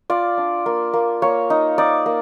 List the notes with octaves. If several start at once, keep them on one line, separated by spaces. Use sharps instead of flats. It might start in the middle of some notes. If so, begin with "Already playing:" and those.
F4 D5
D4
A#3
A#3
A#3 C#5
D#4
D#4 D5
A#3